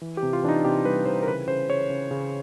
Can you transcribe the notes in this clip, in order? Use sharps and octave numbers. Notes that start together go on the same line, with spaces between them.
E3
G4
C3
F4
E3 D4
D#4
C3 G4
G3 B4
E3 C5
A#4
C#3 B4
C#3 C5
C#3 C#5
C#3
C#3